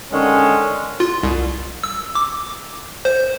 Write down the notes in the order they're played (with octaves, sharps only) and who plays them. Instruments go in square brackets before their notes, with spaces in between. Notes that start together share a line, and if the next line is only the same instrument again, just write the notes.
[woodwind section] D3 D#3 G#3 C#4
[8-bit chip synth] F4
C2
E6
D6
C5